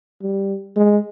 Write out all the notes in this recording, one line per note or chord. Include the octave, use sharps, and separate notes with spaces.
G3
G#3